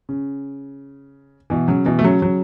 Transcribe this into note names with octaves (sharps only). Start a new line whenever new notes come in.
C#3
B2 E3
C#3 F#3
B2 E3
A3
C#3 F#3
C#3 F#3